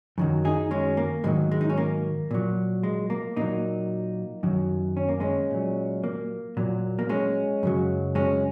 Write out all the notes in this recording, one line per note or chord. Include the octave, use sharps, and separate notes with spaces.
F#2 D#3 F#3
D#4 G#4
G#3 C#4
A#3
G#2 D#3 F#3 G#3
G#3
D#4
C#4
A#3
A#2 F#3
G#3
A#3
A#2 F#3 A#3 D#4
F#2 D#3 F#3
C#4
A#3
G#3 C#4
A#2 F#3
A#3
A#2 F#3
A#3
G#3 C#4
F#2 C#3 F#3
G#3 C#4